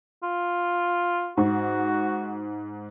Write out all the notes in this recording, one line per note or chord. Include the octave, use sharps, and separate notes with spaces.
F4
G#2 F#4